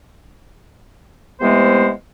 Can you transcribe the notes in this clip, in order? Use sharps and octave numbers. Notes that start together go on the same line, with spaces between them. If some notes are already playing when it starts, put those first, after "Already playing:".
C3 E3 G#3 A3 B3 C5